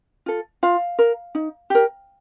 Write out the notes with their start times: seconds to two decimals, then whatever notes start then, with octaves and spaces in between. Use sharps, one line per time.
0.26 F4 A4
0.63 F4 F5
0.99 A#4
1.35 D#4
1.70 G4 A#4